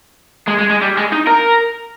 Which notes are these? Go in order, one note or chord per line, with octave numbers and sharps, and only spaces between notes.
G#3
G#3
G#3
G3
G#3
D#4
A#4